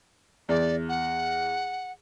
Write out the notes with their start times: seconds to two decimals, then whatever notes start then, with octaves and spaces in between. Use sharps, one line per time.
0.49 E2 D5
0.89 F#5